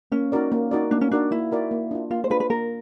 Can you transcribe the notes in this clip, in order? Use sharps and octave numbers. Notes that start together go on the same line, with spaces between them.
A#3 C#4
D#4 F#4 A#4 D5
A#3
D#4 F#4 A#4 D5
A#3 D4
C#4
D4 D#4 F#4 A#4 D5
A#3 E4
D#4 F#4 A#4 D5
A#3
D4 F4
A#3 F4
C5
D4 F4 B4
B4
A#3 A#4